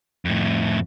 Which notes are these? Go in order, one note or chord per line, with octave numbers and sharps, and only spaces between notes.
F2 A2